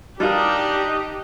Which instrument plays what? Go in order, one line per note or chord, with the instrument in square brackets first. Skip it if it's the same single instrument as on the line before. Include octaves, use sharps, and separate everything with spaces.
[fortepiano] G3 F4 A#4 [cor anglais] D4 [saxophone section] D#4 D#5 [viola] G4